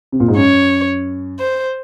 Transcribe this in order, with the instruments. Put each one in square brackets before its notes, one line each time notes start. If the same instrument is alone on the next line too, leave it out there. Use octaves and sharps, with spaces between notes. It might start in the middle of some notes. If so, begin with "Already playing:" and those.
[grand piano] C3
A#2
G#2
[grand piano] F#2 [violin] C#5
[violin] C5